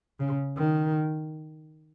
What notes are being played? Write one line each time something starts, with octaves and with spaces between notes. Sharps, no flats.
C#3
D#3